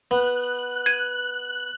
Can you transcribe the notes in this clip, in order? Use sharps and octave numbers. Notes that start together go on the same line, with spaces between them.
B3 F#6
G#6 D#7